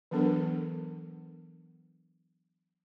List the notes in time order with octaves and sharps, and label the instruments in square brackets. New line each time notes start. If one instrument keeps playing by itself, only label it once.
[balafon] E3 F#3 B3 D4 A4 A#4